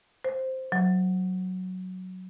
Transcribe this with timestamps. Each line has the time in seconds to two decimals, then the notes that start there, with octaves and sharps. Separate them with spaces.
0.24 C5
0.72 F#3